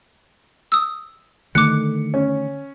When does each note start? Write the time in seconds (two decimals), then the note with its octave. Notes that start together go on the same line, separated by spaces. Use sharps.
0.72 D#6 E6
1.55 D3 D#3 A3 D6 F#6 C#7
2.14 C#4